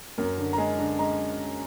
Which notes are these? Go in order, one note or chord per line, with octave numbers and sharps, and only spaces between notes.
F#2 A#4
D3
A#5
G#3 G#5
D3
G#3 A#5